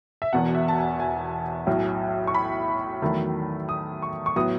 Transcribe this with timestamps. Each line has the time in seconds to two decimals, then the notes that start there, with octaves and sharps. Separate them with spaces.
0.22 E5
0.33 E1 E2 B2 F#5
0.55 E5
0.68 A5
0.78 G#5
1.00 G#5
1.67 B1 A2 F#3
2.27 C#6
2.35 B5
3.02 E2 D#3 F#3 A3
3.69 D#6
4.02 C#6
4.26 C#6
4.36 A2 F#3 B3 D#6